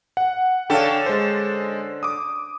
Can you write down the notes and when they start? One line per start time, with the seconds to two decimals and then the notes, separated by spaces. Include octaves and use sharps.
0.17 F#5
0.70 D3 C#4 A4 F5 G5
1.06 G#3 C5
2.03 D6 D#6